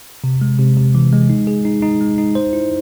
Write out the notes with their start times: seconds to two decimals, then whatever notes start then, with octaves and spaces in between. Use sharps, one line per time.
0.24 C3
0.41 G#3
0.59 C3
0.77 C3
0.95 E3
1.13 G#3
1.30 D#4
1.47 G#4
1.65 D#4
1.82 D#4
2.01 G#3
2.18 D#4
2.35 C5
2.53 E4